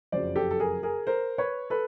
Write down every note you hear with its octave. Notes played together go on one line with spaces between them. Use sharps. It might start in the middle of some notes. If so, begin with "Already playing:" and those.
F#1 F2 C#3 F#3 C5 D5
G4 A4
A4
G#4 A#4
G#4 A#4
A#4 C5
B4 C#5
A4 B4